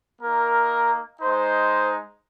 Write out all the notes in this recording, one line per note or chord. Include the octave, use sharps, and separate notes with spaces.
A#3 D#4 A#4
G#3 D#4 C5